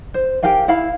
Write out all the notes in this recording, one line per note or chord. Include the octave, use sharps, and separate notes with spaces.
C5
G4 A#4 F5 G#5
E4 F5 B5